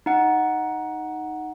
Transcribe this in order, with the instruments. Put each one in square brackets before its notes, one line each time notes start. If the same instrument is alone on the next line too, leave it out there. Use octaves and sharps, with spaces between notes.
[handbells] D#4 F#5